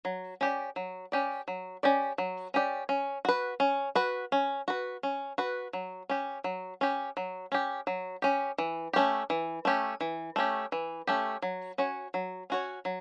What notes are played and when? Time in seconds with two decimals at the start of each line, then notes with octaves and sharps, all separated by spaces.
0.05 F#3
0.41 C#4 G4 D5
0.76 F#3
1.12 C#4 G4 D5
1.48 F#3
1.83 C#4 G4 D5
2.18 F#3
2.54 C#4 G4 D5
2.89 C#4
3.25 F#4 B4
3.60 C#4
3.95 F#4 B4
4.32 C#4
4.68 F#4 B4
5.03 C#4
5.38 F#4 B4
5.73 F#3
6.09 C#4 G4
6.44 F#3
6.81 C#4 G4
7.17 F#3
7.52 C#4 G4
7.87 F#3
8.22 C#4 G4
8.58 E3
8.93 A3 C#4 G4
9.30 E3
9.65 A3 C#4 G4
10.01 E3
10.36 A3 C#4 G4
10.72 E3
11.07 A3 C#4 G4
11.42 F#3
11.78 C#4 F#4 C#5
12.14 F#3
12.50 C#4 F#4 C#5
12.85 F#3